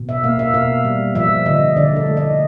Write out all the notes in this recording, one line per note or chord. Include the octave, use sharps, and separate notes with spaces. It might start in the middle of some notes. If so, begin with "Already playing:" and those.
Already playing: B2
E5
A#3 F5
E5
B2 F5
G3
F3 E5
D3 D#5
D3 D5
A4
A3
D#5